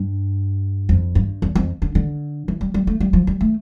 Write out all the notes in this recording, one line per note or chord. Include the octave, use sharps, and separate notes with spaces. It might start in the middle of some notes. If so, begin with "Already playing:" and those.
Already playing: G2
F2
G2
E2
F2
D3
D3
E3
G3
G3
A3
G3
F3
G3
A3